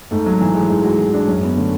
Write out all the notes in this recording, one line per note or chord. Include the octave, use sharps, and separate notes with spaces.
G#2 A3
F#3
E3
G#3
G#2 G#3
F#4
E3
D4
F#2 C#4
B3
D3 A3